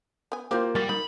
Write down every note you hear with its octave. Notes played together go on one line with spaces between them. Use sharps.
B3 G#5
A#3 C4 F4 G4 C5
G3 F#4 A#4 A6
D#4 A#4 B5